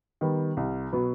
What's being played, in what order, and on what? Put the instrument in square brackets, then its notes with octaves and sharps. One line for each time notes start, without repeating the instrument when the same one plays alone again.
[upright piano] D#3 G3 B3
C2
B2 F#3 B3